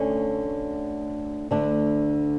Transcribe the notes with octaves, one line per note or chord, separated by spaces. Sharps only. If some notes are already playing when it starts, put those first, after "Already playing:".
Already playing: D2 D3 A3 C#4
D2 D3 A3 D4